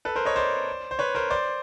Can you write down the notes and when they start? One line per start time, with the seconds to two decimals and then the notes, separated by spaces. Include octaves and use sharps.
0.05 A4 B4
0.15 A#4 C5
0.25 C#5 D#5
0.36 C5 D5
0.91 C5
0.99 B4 C#5
1.15 A#4 C5
1.30 C5 D5